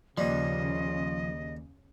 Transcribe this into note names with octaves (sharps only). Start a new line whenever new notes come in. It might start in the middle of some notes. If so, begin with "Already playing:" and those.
D#2 C#3 F3 G3 D#5